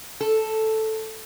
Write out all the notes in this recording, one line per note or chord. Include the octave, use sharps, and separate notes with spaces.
A4